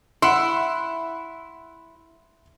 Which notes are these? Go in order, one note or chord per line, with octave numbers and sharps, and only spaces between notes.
E4 F#5 C6